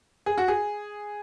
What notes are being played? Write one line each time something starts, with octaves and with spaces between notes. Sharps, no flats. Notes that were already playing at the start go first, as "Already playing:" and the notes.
G#4
F#4
G#4